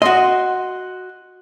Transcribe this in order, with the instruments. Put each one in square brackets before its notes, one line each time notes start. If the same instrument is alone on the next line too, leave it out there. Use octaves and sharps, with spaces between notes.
[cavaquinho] F#4 C6 [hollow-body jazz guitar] D#5